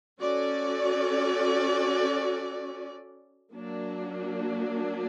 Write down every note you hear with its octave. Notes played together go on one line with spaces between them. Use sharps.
C#4 F#4 A4 D5
F#3 A#3 D4